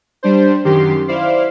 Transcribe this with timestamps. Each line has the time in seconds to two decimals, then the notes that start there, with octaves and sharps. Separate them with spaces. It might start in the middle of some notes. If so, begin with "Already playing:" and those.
0.23 G3 D4 C5
0.64 F#2 D#3 G4 C6
1.08 E4 C5 D5 F5